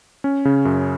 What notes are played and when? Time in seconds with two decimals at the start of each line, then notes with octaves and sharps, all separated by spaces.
0.24 C#4
0.45 C#3
0.65 F#2